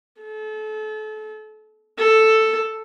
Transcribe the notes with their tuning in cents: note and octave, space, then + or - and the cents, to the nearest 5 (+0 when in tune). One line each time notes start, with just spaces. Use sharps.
A4 -35
A4 +5